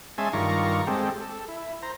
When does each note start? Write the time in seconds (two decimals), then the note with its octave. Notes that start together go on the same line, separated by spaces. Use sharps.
0.18 G#3 C#4 E5 G#5 A5 C6
0.33 G2 D#3 F4 D5 A#5 C#6
0.87 G#3 C4 G4 A4
1.21 A4
1.48 E4
1.83 C5 A#5